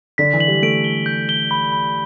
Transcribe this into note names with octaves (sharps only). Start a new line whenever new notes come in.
D3 B6
E3
F#7
G3
A3 D7
G7
G6
G7
B5
B5